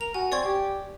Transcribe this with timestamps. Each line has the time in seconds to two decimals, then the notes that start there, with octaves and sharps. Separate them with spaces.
0.01 A#4 F7
0.14 F#4 G#5
0.32 C4 D5 C#6 G#6
0.45 G4